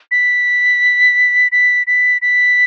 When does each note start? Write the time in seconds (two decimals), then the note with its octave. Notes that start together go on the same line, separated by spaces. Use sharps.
0.11 B6
1.52 B6
1.87 B6
2.22 B6